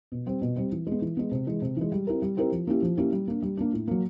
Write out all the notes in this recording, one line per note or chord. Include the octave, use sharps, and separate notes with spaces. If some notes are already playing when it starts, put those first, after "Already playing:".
B2
G3 C4
B2
G3 C4
E3
G#3 B3
E3
G#3 B3
C3
E3 G#3
C3
E3 G#3
G3
C4 E4 G4 A#4
G3
C4 E4 G4 A#4
F3
A#3 C#4 E4 G4
F3
A#3 C#4 E4 G4
G3
A#3 D4
G3
A#3 D4
A2
F#3 A#3